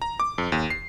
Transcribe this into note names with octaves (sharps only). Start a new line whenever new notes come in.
A#5
D6
F2
D#2
C7